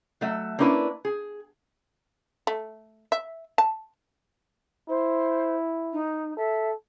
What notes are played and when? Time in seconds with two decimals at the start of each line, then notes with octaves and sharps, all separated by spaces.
0.21 F#3 A3 E5
0.59 A#3 C#4 D4 E4 B4
1.05 G#4
2.47 A3
3.12 E5
3.58 A5
4.89 E4 C5
5.93 D#4
6.37 A4 E5